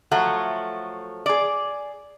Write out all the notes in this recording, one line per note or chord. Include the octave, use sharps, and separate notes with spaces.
F3 F#3 A3 F#4
G#4 D5